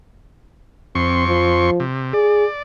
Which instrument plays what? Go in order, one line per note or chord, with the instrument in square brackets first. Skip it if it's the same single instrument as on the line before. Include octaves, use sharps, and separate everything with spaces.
[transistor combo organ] F2 C6 C#6 [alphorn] C4
[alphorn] F3
[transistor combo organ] C3
[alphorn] G#4 [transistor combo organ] D5